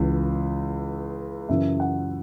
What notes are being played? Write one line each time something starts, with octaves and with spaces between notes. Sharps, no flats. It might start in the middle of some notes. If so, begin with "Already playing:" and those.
Already playing: C#2 C#3 E3
F#2 C#3 E3 E5
F#5